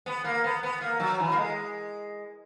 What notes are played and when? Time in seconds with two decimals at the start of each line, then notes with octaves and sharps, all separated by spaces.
0.06 B3
0.24 A#3
0.44 B3
0.63 B3
0.81 A#3
1.00 F#3
1.20 E3
1.32 A#3
1.37 G#3